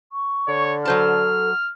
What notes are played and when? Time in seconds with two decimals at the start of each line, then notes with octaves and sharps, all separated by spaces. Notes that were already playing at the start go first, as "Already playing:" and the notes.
0.12 C#6
0.48 D3 C#5
0.85 F#3 A4 C5 A5 F6